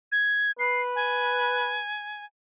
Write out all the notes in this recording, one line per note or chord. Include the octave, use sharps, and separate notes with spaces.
G#6
B4 C7
G#5